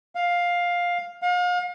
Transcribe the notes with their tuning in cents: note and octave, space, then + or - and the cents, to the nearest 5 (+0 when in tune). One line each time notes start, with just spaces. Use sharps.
F5 +10
F5 +40